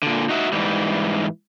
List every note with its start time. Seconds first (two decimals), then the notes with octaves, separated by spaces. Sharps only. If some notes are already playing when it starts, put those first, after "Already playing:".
0.03 A#2 D3
0.29 D#4 F#4 E5
0.52 G#2 E3 G3